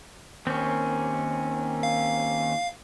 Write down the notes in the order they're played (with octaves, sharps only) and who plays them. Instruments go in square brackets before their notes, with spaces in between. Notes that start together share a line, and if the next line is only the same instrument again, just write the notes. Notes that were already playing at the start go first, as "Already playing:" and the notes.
[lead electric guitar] D#2 [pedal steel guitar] C4 C#4
[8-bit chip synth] F5